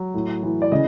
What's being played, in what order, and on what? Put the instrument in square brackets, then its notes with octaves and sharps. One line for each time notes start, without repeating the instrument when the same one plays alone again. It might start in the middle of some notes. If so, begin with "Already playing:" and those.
Already playing: [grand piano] F#3
A2
E3
D5
C#3 D#5